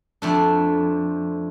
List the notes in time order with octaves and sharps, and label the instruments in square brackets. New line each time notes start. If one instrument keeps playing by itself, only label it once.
[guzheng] F2 A3 D4